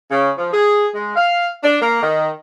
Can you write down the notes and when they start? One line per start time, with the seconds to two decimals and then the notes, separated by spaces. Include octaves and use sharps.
0.11 C#3
0.38 F3
0.52 G#4
0.94 G#3
1.16 F5
1.64 D4
1.82 A#3
2.02 D#3